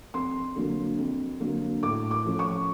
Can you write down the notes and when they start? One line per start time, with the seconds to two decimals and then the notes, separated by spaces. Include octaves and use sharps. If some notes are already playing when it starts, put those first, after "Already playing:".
0.14 F2 C6
0.56 D3 F#3 A#3
0.98 F2
1.40 D3 F#3 A#3
1.83 A2 D6
2.11 D6
2.25 F3 A3 C#4
2.39 C#6